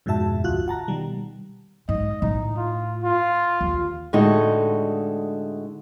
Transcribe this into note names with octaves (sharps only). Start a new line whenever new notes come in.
F2 G#2 B2 F#4 E5 A5
G1 D2 F4 F#4 F#6
F#5 A5 A#5
B2 D#3 G3
G#2 D#5
A2 D#4
F4
F4
D#2
A2 D3 G#3 D#4 F#4 A4